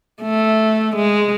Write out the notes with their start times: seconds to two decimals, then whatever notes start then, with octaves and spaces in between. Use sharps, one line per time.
0.22 A3
0.95 G#3